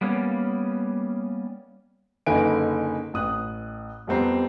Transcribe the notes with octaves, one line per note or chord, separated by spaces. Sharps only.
G3 A#3 B3 C#4
F#1 D3 D#4 B4 G#5 D7
A1 D#6 F#6
F2 G3 B3 C4 A#5 C7